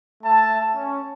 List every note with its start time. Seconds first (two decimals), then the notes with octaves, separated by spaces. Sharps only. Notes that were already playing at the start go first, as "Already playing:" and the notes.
0.24 A3 E5 A5
0.76 C#4